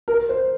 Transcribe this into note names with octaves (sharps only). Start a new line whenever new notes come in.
A#4
C5